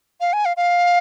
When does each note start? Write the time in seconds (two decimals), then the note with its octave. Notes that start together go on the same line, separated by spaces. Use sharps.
0.21 F5
0.33 G#5
0.45 F5
0.57 F5